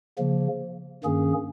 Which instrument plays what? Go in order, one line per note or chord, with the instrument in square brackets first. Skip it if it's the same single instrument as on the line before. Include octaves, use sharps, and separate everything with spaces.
[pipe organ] C#3 F3 A#3
G2 D#3 A#3 C#4 G#4